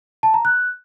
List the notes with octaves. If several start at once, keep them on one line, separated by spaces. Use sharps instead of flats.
A5
A#5
F#6